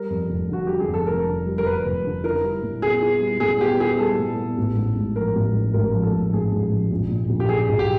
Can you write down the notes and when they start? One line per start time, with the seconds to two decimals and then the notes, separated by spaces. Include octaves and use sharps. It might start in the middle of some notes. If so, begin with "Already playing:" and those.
Already playing: G3 A#4
0.10 F2
0.30 F1
0.49 D3 F#4
0.67 G3 G4
0.80 G#4
0.88 F2
0.94 A4
1.07 F1 A#4
1.27 D3
1.46 G3
1.58 A#4
1.65 F2 B4
1.85 F1
2.05 D3
2.24 E4 A#4
2.43 G3
2.63 A#2
2.82 B3 G#4
3.02 E4
3.21 G3
3.40 A#2 G#4
3.60 B3 G4
3.80 E4 G#4
3.99 G3 A4
4.19 A#2
4.38 B3
4.58 A1
4.77 G#2
4.96 A1
5.16 F3 A#4
5.36 A1
5.55 G#2
5.74 A1 A#4
5.94 F3
6.03 A4
6.13 A1
6.33 G#2 G#4
6.52 A1
6.72 F3
6.91 A#1
7.10 A#2
7.30 A#1
7.40 G4
7.49 F#3 G#4
7.69 A#1
7.79 G4